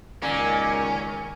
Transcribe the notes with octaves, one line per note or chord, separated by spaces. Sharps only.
C#2 A#2 D#3 A#3 C#4 G#5